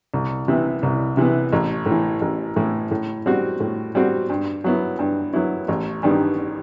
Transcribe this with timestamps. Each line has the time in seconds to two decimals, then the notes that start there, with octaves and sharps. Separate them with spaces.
0.14 C2
0.48 C3 E3 B3
0.83 C2
1.17 C3 E3 B3
1.52 A1
1.86 A2
1.91 E3
2.21 A1
2.56 A2 E3
2.91 A2
3.26 G3 C4 F#4
3.60 A2
3.95 G3 C4 F#4
4.30 G2
4.64 F#3 B3 E4
4.99 G2
5.33 F#3 B3 E4
5.68 A1
6.03 G2 D#3 G3 B3